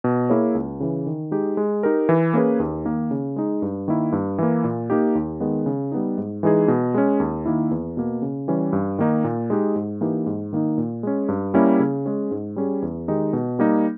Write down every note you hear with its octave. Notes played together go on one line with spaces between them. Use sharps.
B2
A#3 E4 G#4 C#5
C#2
C#3 E3
D#3
G#3 D#4 G4
G#3
D#4 G4 A#4
E3
A#3 C#4 G#4 B4
D#2
D#3 A#3 D#4
C#3
G#3 D#4
G2
D#3 A#3 E4
G2
E3 A#3
A#2
A#3 D#4 G4
D#2
D#3 G#3 B3
C#3
G3 B3 D#4
G#2
E3 G#3 D#4 G#4
B2
G#3 C#4
D#2
D#3 A#3 E4
E2
B2 A#3
C#3
E3 G3 C#4
G2
D#3 A#3 D#4
A#2
G#3 D#4 G4
G#2
E3 A#3 D#4 G4
G#2
D#3 A#3 D#4
A#2
G#3 C#4
G2
G3 A#3 C#4 E4
C#3
G#3 C#4
G#2
G3 C#4 G#4
E2
D#3 G#3 D#4 G4
B2
G3 A#3 D#4